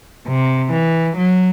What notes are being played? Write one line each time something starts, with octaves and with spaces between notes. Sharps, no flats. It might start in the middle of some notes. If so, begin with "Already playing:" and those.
C3
E3
F#3